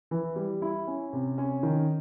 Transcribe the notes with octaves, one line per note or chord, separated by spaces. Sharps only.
E3
G3
E4
C#4
C3
C#4
D#3